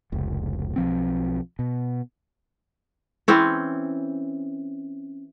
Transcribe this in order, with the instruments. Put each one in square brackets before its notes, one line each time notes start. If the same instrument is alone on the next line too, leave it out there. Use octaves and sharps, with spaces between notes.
[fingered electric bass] F1 C#2
B1 F3 C4
B2
[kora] E3 C4 C#4